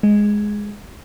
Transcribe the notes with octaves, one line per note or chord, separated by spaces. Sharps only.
G#3